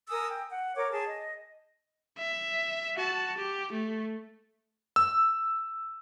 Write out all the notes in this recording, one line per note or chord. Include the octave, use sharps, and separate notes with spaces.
A#4 G#5 D#6 E6
G5
F#5
A#4 C#5 D6
G#4 A5
D#5
E5
F#4 A5
G4
A3
E6